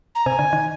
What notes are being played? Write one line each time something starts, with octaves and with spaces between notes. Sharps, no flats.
A#5
C3 G#5
D3
D#3